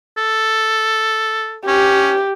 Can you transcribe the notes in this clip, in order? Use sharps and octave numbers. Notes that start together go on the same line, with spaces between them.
A4
C#4 G4